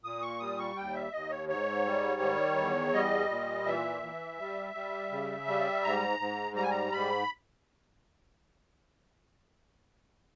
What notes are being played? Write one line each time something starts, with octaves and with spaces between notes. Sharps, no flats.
A#2 D#6
C#6
G3 D#6
C#6
D#2 G5
E5
D#2 D#5
C#5
G#2 C#5
G3
D#3
E2
G3 D#5
A#2
E3 E5
E3
G3
G3
C#3
G3
G#2 A#5
G#2
G3 A#5
G#5
A#5
G#2 B5